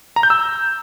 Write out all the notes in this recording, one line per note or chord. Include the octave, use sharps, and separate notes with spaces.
A#5
G6
E6